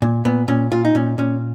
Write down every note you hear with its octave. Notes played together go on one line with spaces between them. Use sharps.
A#2
A#2 B3
A#2 C#4
A#2 F4
D#4
A#2 C#4
A#2 C#4